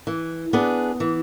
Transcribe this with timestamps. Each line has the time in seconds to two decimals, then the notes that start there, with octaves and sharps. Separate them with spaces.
0.07 E3
0.53 B3 D4 G#4 B4
1.00 E3